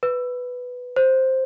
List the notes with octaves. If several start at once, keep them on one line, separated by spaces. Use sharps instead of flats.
B4
C5